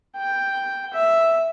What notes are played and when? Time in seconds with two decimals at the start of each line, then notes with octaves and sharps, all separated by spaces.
0.17 G5
0.93 E5